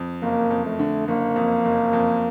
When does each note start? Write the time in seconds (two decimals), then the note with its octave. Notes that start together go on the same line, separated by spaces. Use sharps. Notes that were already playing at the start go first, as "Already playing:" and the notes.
Already playing: F2
0.22 F#1 A#3
0.51 F2
0.66 A3
0.79 D3
1.08 F#1 A#3
1.36 F2
1.65 F#1
1.93 F2